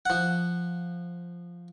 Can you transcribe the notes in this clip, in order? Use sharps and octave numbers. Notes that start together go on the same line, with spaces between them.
F3 F#5